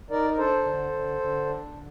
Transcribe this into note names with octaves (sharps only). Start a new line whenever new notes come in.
D#4 A#4 D5
A#4
D4 A4 C5
D3
D3
D3
D4
D3